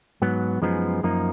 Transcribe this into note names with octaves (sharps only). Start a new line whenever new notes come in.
G#2 F#3 B3
F#2 F3 G#3 B3 D#4
F#2 F3 A#3 D#4